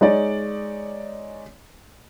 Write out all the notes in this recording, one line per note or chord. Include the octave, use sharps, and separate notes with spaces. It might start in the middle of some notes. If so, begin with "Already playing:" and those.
G#3 D#4 C#5 D5